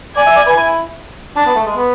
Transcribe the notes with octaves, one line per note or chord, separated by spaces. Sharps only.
D5 G#5
E5
D5
B4
E4
D4 A5
B3
A3
G#3
B3